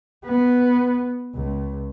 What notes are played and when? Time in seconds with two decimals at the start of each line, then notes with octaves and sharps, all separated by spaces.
0.25 B3
1.34 C#2